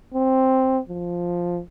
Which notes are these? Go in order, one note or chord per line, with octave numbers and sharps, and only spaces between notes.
C4
F3